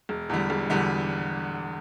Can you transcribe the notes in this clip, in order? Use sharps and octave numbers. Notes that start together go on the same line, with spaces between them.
E1
E2 D3 G3
E1
E2 D3 G3